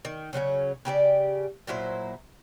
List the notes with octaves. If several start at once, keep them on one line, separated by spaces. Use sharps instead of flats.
D#3
C#3 F#3 B3 C#4
C#3 G4 A4 D5
A#2 F#3 E4 C5